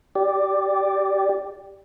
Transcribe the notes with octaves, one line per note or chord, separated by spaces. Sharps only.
G4 D5